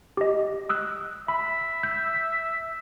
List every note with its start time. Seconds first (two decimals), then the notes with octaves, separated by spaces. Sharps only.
0.17 G4 D#5
0.69 D#6 E6 F#6
1.28 E5 B5
1.83 G6